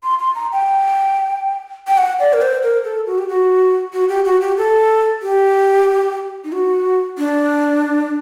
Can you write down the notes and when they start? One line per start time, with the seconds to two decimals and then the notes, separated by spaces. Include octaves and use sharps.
0.03 C6
0.19 C6
0.35 A#5
0.52 G5
1.88 G5
1.97 F#5
2.19 D5
2.33 A#4
2.42 C5
2.63 A#4
2.84 A4
3.07 F#4
3.18 G4
3.28 F#4
3.93 F#4
4.09 G4
4.25 F#4
4.41 G4
4.58 A4
5.23 G4
6.44 D#4
6.52 F#4
7.18 D4